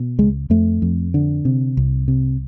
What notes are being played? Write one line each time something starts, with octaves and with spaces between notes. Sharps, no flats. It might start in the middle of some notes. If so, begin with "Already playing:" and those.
Already playing: B2
C#2 G#3
F2 A3
F2
D3
C3
C2
C3